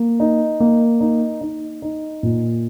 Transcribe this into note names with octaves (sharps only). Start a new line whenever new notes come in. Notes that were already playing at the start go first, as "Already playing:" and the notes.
Already playing: A#3
D#4
A#3
D#4
D#4
D#4
A#2